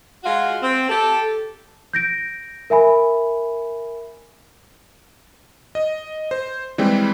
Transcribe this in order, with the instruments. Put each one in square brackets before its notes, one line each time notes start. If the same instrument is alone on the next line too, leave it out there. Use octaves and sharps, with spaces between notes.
[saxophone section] G#3 F4 F#4
C4
G4 A4
[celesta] G6 A#6 D7
A#4 E5 G#5 B5
[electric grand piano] D#5
C5
E3 G3 G#3 C4